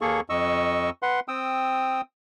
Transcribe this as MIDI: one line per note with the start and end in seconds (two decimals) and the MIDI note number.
0.01 0.21 39
0.01 0.21 58
0.01 0.21 68
0.01 0.21 69
0.01 0.21 85
0.30 0.90 41
0.30 0.90 75
0.30 0.90 85
0.30 0.90 88
1.02 1.20 71
1.02 1.20 78
1.02 1.20 84
1.28 2.01 60
1.28 2.01 79
1.28 2.01 87
1.28 2.01 88